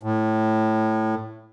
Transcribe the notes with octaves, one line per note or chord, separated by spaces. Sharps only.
A2